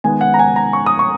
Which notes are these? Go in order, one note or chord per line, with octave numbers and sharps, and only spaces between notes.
D#3 G#3 B3 G#5
F#5
A#5
G#5
A#5
C#6
D#6
C#6